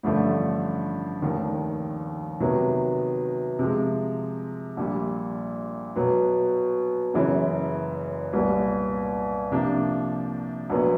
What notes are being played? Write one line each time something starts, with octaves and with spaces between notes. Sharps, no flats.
A1 G2 D3 F3 A3
F1 D#2 D#3
C3 D#3 F#3 B3
C3 F3 G#3
A#1 A#2 G3
B2 F#3 B3
F#1 F#2 C#3 E3
C2 A#2 G3 B3
C3 F3 A#3 D4
A#1 A#2 F#3 B3